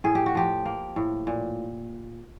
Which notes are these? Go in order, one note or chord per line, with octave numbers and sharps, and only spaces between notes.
A2 G#4
G4
F#4
F3 G4
A#3
A2
A#2